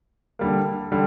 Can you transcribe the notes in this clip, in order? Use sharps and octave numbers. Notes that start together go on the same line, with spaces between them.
D3 G3 A#3
D3 G3